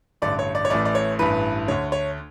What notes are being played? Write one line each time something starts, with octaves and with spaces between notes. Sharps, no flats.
A1 G2 D3 D5
C#5
D5
C#5
A1 A2 E3 D5
D5
C#5
A1 G2 E3 B4
D2 D3 C#5
C#5